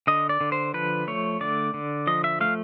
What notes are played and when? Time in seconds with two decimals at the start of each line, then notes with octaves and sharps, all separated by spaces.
0.07 D3 D#5
0.29 D5
0.41 D3
0.52 C5
0.74 F3 B4
1.07 A3 C#5
1.41 D3 D5
1.74 D3
2.07 F3 D#5
2.24 E5
2.41 A3 F5